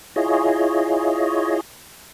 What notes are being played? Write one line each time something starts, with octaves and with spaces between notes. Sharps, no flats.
E4 F4 G#4 C#5 D#5